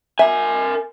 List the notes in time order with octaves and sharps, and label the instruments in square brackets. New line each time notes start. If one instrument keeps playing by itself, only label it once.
[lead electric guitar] A#4 G#5 [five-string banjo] E5